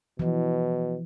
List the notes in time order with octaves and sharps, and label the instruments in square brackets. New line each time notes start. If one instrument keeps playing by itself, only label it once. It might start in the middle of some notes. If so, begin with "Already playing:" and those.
[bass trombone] B2 [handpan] E3 F3